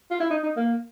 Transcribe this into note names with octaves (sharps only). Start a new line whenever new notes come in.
F4
E4
D#4
D#4
A#3